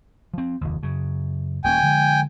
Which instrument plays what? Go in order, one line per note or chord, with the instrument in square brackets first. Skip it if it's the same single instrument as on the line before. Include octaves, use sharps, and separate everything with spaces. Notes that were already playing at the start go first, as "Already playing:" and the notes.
[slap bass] F3 C4
F1 D#2
F#2 C#3
[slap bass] D#1 A#3 C#4 [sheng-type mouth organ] G5 G#5
[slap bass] D3 F3 G#3